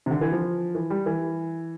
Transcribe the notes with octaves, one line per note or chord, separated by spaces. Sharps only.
C3
D3
E3
F3
E3
G3
E3